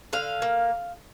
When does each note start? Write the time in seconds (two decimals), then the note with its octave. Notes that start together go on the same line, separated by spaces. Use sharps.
0.13 D3 F5
0.42 A#3